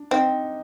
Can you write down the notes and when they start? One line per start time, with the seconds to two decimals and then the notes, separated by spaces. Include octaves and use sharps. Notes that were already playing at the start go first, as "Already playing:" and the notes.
Already playing: D4
0.11 C4 D#4